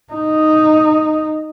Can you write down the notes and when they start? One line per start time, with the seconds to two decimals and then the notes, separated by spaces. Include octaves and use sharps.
0.13 D#4